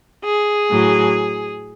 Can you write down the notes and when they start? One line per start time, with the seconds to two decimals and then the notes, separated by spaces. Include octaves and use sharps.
0.25 G#4
0.70 A2 F#3